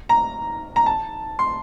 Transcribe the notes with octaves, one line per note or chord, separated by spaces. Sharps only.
A#5
A#5
A5
C6